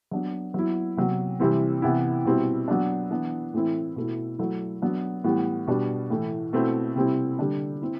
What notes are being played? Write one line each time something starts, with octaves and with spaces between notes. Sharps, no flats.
F#3 B3 D4
F#3 B3 E4
C3 F#3 B3
C3 E3 G3 C4 E4
C3 E3 B3 E4
B2 G3 C4 E4
F#3 B3 D4
E3 B3 D4
A2 E3 A3 C4 E4
B2 A3 E4
F#3 A3 E4
F#3 B3 D4
A2 E3 G3 B3
B2 G3 D4
A2 E3 A3 E4
B2 A3 C4 E4
C3 G3 C4 E4
D3 G3 D4
C4 E4